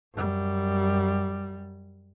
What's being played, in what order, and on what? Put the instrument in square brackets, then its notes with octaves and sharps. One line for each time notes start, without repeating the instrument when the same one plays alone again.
[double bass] F#2 G3